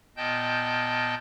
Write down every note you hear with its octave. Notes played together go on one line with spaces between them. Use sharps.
A#2 B3 D#5 G5 A5 G6